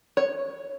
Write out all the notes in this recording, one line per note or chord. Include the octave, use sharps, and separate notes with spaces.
C#5